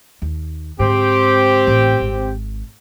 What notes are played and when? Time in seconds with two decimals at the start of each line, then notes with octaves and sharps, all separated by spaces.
0.22 D#2
0.79 G#2 D3 C4 G4
1.67 A1
2.00 G#1